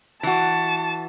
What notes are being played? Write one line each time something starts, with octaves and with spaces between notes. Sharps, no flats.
E3 F#4 A5